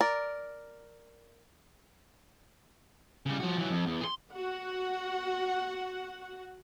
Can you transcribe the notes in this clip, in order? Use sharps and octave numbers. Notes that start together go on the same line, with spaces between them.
A#4 D5
C#3 G3
F3 F#4
E3 F#3
F2
E2
G#4 C6
F#4 F#5